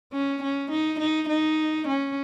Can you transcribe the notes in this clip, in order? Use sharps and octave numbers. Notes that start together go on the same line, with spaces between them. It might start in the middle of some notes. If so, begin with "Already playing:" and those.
C#4
C#4
D#4
D#4
D#4
C#4